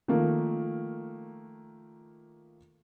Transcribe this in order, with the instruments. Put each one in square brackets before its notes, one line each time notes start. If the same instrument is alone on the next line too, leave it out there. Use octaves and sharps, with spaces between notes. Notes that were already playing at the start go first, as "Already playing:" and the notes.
[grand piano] D#3 F3 A3 A#3